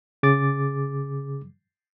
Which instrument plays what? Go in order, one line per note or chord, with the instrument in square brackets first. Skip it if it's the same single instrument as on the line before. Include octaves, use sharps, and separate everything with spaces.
[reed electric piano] C#3 G#4 D6 A6